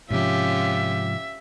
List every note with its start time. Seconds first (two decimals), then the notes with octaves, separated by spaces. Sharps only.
0.10 G#2 C3 F3 C#4 F4 G4 E5